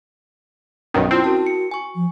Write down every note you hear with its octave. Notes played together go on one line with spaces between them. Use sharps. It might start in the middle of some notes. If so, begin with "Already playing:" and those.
B1 G2 D#3 C#4
C4 E4 F4
F#4 A#4 A5
C#7
G#5 C#6
F3